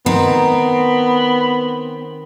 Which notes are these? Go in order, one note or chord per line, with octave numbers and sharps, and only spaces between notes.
D#3 B3 C4